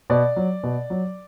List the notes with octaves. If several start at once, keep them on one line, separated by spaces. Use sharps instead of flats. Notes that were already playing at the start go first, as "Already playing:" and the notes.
B2 D5
F#3
B2
F#3